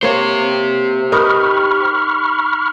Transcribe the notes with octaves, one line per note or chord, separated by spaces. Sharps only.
A#3 G4 C5 C#5
D#4 A#4 B4 B5 C#6 F6